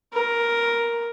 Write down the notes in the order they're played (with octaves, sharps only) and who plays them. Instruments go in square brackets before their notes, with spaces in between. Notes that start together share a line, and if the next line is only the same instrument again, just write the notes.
[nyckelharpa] A#4